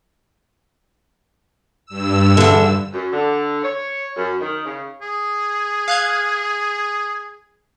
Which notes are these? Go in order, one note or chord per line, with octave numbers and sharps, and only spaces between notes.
G2 E6
E2 D3
F#2
D3
C#5
F#2
D#3
C#3
G#4
F5 F#6 G#6